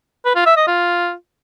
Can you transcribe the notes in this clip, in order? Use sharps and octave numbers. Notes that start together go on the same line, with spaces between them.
B4
F4
E5
D#5
F4